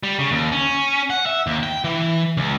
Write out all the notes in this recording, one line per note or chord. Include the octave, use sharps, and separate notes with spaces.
G3
C#3
D#2
C#4
F#5
E5
D#2
G5
E3
C#2